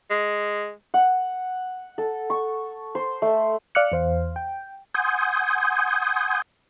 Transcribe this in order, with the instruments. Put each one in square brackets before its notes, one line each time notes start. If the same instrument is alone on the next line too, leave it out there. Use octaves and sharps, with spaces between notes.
[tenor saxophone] G#3
[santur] F#5
A4
C#6
C5
A3
[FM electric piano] D5 F5 D6 F6 F#6 C#7
E2 C5 F5
G5
[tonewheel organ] F#5 G#5 C6 D#6 G6 G#6